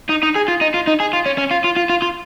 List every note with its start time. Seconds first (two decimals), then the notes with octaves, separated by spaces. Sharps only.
0.10 D#4
0.23 D#4
0.36 G#4
0.48 F4
0.61 D#4
0.74 F4
0.87 D#4
1.00 G#4
1.13 F4
1.26 C#4
1.38 C#4
1.51 F4
1.64 F4
1.76 F4
1.90 F4
2.02 F4